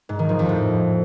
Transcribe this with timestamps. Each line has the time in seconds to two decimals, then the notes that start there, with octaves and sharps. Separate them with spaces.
0.09 G#2
0.19 D#3
0.29 F3
0.39 F2
0.49 A2